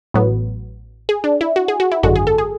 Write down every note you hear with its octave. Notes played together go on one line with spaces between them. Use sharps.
A1 A2 F#3 B3
G#4
D4
E4
F#4
G#4
F#4
E4
G#1 F#2 D3 G#3 F#4
G#4
A4
G#4